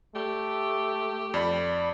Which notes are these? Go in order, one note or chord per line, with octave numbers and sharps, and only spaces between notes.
A3 G4
F2 D5 B5